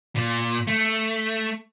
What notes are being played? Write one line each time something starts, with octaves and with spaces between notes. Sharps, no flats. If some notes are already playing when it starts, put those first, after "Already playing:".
A#2
A3